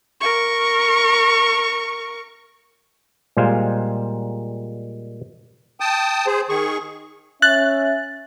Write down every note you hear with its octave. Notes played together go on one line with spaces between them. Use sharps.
A#4 C#6
A#2 G3 G#3 C5 F5 G#5
G5 A5 D#6
G#4 C5
D#3 G#4 C#6
C#4 E5 F#6 A6